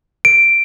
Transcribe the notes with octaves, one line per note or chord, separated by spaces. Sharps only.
D7